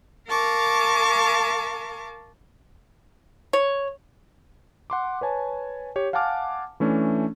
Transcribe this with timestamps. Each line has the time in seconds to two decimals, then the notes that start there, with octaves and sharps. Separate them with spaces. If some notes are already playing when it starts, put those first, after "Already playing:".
0.29 A#4 F5 A5 C#6 D6
3.53 C#5
4.90 F#5 C6 D6
5.21 B4 C#5 G#5 A5
5.96 G4 C#5
6.13 F5 F#5 G#5 A5 D6 F6
6.80 E3 A3 C#4 D4